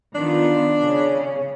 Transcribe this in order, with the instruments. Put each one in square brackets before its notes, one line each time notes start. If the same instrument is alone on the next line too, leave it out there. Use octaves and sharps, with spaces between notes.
[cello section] D#3 B3 F4 [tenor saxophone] D4
[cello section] C#3 C#4